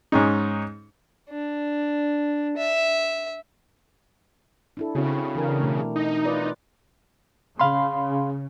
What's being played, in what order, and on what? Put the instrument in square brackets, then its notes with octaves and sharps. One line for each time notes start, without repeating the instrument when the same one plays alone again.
[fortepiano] G#2 C#4 D#4
[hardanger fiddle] D4
E5
[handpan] D4 E4 A4
[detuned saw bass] C#3 [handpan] C4 E4 F#4
[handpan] E3 D4 A#4
B2 A3
[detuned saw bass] D#4
[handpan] F4 B4 D5
[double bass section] C#3 [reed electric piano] F5 B5 C6